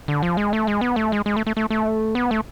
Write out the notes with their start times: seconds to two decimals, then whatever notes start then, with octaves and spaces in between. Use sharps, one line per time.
0.08 D3
0.23 F3
0.37 G#3
0.53 A3
0.67 G#3
0.81 B3
0.96 A3
1.12 G#3
1.26 G#3
1.36 A3
1.47 A3
1.57 A3
1.70 A3
2.15 B3
2.31 A3